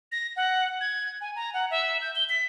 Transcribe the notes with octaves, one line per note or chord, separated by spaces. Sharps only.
A#6
F#5
G#6
G#5
A#5
F#5
E5
G6
G7
B6